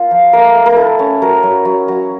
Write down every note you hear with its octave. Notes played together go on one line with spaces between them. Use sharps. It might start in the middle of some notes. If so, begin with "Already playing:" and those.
Already playing: A#3 F4
F3
A3 A#4
A3
A#4
E4 A4
C#4
F#3 A#4
F#3
F#3
F#3